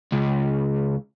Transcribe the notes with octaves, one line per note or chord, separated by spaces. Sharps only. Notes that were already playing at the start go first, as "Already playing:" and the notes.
C#2